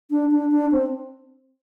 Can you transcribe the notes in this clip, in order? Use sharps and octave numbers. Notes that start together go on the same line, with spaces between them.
D4
D4
D4
C4